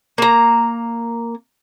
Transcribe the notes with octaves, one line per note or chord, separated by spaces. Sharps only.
A#3 A#5